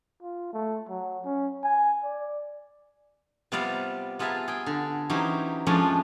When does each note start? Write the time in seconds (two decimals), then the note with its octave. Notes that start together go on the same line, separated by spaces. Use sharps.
0.22 F4
0.53 A3
0.89 F#3
1.24 C#4
1.64 G#5
2.04 D5
3.52 C3 G3 B3 F4 D5 F5
4.19 B3 F4 G#4 E5 A5 A#5
4.48 G#4 G5
4.66 D3
5.10 E3 F#3 C#4 D#4 G4 C5
5.67 F2 F3 G#3 A3 C#4 D4